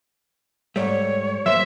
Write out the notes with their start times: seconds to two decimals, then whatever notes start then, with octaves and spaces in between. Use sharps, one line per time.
0.76 G#2 G3 A3 C#5
1.46 F#3 A#3 C5 E5